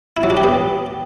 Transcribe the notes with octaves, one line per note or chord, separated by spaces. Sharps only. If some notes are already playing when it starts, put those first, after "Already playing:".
E4
F#3
D4
G4
B3